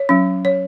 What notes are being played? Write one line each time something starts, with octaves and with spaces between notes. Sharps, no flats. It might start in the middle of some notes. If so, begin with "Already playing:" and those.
Already playing: C#5
F#3 C#4
C#5